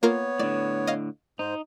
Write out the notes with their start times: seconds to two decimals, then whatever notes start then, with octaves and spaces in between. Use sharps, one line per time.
0.03 A#3 B3 F4 A#4 C#5
0.39 A2 D3 D5
0.87 D#5 F5
1.39 G#2 D#4 C5